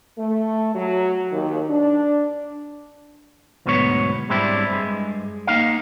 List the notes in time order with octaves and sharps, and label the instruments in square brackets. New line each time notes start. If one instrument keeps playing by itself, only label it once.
[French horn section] A3
F#3
D#2
D4
[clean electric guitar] D2 G#2 B2 F#3 B3 C#5
G#2 G3 C4 D4 E4
G2 G#3
A#3 D#4 F5